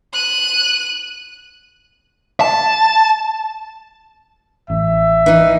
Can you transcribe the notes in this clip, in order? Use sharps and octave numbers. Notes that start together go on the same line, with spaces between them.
F#6 D#7
A5
A1 E5
E3 D#4